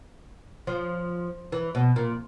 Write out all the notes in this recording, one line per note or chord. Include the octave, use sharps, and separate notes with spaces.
F3
E3
B2
A#2